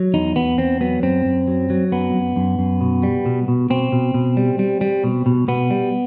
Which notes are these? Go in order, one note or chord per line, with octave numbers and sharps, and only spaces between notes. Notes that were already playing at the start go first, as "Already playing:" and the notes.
Already playing: F#3
E2 D#4
E2 B3
E2 C4
F#3 B3
F#2 C4
F#2
F#3
F#3
F#2 B3
F#2
F#2
F#2
B2
G3
B2
B2
B2 C4
B2
B2
G3
G3
G3
B2
B2
B2 B3
G3